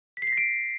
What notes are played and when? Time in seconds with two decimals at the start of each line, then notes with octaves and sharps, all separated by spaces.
0.17 B6
0.22 C7
0.27 B6
0.32 A#6
0.37 D7